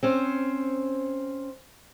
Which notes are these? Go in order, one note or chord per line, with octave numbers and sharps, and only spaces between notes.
C4 C#4 C5